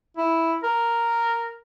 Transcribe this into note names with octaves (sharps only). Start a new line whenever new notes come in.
E4
A#4